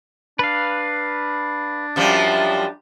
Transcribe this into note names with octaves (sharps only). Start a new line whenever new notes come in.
D4 B4 F5
F#2 F3 G3